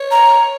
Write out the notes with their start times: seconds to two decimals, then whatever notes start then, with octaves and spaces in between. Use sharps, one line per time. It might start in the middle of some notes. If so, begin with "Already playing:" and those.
Already playing: C#5
0.11 A#5